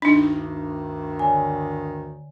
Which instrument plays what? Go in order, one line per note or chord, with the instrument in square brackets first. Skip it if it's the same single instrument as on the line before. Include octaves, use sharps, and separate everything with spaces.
[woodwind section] D2 G2 D#3 [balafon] D4 D#4
[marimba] D3 C#5 G#5